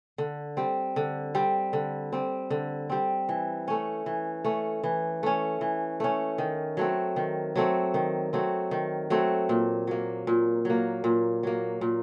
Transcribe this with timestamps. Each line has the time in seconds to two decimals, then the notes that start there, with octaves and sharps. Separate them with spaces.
0.18 D3
0.57 G3 C4
0.96 D3
1.35 G3 C4
1.73 D3
2.12 G3 C4
2.50 D3
2.90 G3 C4
3.29 E3
3.68 A3 C#4
4.06 E3
4.44 A3 C#4
4.84 E3
5.23 A3 C#4
5.61 E3
6.00 A3 C#4
6.38 D#3
6.77 F#3 A3 C4
7.16 D#3
7.56 F#3 A3 C4
7.94 D#3
8.33 F#3 A3 C4
8.71 D#3
9.10 F#3 A3 C4
9.49 A#2
9.87 F#3 A#3
10.27 A#2
10.65 F#3 A#3
11.04 A#2
11.43 F#3 A#3
11.81 A#2